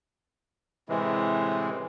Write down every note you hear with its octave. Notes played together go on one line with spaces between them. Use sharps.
A2 C3 E3 G#3